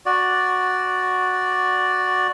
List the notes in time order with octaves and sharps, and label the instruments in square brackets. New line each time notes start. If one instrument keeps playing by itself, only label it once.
[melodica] F#4 D5